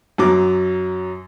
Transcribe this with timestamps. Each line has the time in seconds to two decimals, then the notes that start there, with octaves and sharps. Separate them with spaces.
0.18 F#2 F#3 D6